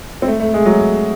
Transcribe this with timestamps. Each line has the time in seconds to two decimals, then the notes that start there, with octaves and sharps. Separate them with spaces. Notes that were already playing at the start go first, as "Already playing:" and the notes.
0.22 C4
0.28 A3
0.40 A3
0.54 G#3
0.66 F#3